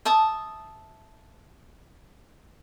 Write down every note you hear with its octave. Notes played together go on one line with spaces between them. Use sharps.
E5 A5 D#6